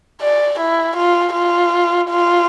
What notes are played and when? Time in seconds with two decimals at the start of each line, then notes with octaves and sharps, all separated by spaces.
0.22 D5
0.60 E4
0.97 F4
1.34 F4
2.10 F4